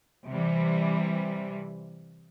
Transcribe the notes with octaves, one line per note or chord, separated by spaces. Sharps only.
C3 E3 G3